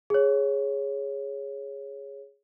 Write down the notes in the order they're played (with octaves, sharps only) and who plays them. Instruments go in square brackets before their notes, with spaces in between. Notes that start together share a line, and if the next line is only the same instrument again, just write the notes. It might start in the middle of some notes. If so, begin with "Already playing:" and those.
[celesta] G#4 C#5